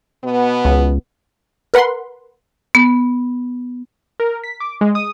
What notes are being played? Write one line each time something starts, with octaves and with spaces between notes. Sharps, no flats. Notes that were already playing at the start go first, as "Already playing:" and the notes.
B2 B3
C#2
A#4 B4 F#5 B5 C6
B3
A#4
B6
D6
G#3
D#6